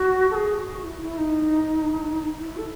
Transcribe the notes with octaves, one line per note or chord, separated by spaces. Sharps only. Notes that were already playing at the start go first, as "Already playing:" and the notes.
Already playing: F#4
A4
G#4
F#4
E4
E4
D#4
E4
A4